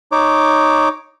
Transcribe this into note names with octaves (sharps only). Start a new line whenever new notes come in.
D#4 C#5 D6